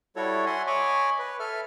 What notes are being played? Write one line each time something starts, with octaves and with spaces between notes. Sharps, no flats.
G3 E4 F#4 A4 C#5
E5 F#5 G#5 C6
C#5 D#5 G#5 B5 C#6 D6
B4
A4 E5 F6